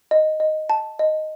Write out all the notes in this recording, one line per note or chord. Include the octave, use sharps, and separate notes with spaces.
D#5
D#5
A5
D#5